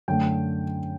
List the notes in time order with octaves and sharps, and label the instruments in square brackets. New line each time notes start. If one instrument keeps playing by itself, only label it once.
[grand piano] F#2 D3 A3 G5